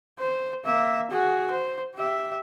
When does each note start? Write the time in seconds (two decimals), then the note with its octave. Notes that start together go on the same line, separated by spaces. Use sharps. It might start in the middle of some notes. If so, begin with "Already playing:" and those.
0.19 C5
0.65 A#3 E5
1.11 F#4 G#4
1.50 C5
1.95 G4 E5